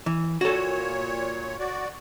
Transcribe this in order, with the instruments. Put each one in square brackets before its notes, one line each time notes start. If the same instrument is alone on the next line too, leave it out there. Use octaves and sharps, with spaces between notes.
[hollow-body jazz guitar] E3
[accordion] A#2 C#5 [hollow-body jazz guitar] F#4 A4
[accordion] F#4 D5